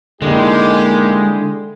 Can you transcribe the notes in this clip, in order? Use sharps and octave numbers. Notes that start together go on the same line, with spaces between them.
D3 G#3 A#3 D#4 E4 G4